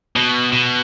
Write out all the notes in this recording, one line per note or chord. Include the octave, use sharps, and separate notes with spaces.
B2
B2